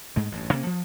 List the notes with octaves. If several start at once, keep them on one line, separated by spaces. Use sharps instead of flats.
G#2 G#3 A3
A1 G2
C3 A#3 C#4
F3